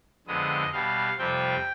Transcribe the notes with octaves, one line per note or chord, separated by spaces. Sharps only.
F2 D3 G#3 B3 D#5
B2 G3 B3 F5
F2 C3 G3 C4 G5